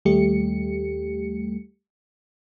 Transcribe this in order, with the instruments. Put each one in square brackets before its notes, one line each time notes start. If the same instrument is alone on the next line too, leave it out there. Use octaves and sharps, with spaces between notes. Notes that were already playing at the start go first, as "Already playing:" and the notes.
[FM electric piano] D#2 G3 A3 G4 C#7